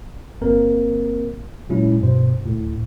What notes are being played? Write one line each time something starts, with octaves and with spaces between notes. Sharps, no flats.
G1 A#3 C4 A#4
A#2 F#3 G#3 C#4 E4
G2 B2 C5
D2 A2